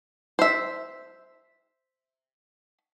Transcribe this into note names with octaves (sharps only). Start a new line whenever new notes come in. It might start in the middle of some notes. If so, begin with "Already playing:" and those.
C5 E5